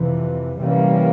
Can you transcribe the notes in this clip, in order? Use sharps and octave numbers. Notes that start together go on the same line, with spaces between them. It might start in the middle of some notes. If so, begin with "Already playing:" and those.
Already playing: F2 C3 E3
C3 E3 G3 A#3 C#4